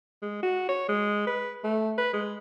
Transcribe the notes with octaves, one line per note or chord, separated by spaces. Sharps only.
G#3
F#4
C#5
G#3
B4
A3
B4
G#3